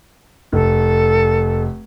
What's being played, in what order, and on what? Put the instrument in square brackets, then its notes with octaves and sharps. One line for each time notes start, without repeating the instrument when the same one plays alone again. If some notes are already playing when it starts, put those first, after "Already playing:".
[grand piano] F1 [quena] A4